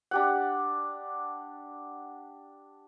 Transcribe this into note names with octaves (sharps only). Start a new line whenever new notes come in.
D4 G4 F#5